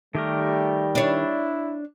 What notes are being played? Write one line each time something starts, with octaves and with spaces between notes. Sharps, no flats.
D#3 G3 A3 G4 A#4
D4 E4 C#5